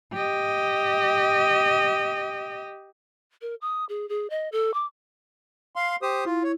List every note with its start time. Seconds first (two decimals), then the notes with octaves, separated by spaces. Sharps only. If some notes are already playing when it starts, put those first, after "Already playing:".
0.13 G4 D#5
3.42 A#4
3.61 D#6
3.89 G#4
4.09 G#4
4.30 D#5
4.52 A4
4.74 D6
5.76 F5 C6
6.02 G4 C5 D#6
6.25 E4 F4
6.44 C#5